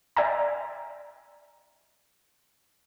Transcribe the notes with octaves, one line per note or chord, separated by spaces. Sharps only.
D5 E5 G5 G#5 A#5